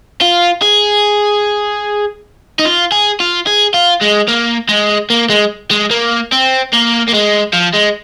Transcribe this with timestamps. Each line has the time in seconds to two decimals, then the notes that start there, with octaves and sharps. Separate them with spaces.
0.22 F4
0.62 G#4
2.59 D#4
2.65 F4
2.92 G#4
3.20 F4
3.47 G#4
3.74 F4
4.01 G#3
4.28 A#3
4.69 G#3
5.10 A#3
5.30 G#3
5.71 G#3
5.91 A#3
6.32 C4
6.73 A#3
7.08 A#3
7.13 G#3
7.53 F3
7.73 G#3